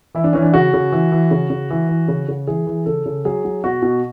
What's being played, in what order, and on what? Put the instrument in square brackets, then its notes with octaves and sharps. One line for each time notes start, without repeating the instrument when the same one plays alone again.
[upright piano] E3 E4
D4
E3 C#4
D4
C#3 F#4
C#3
E3
E3
C#3
C#3
E3
E3
C#3
C#3
E3 G#4
E3
C#3 A4
C#3
F#3 G#4
F#3
B2 F#4
B2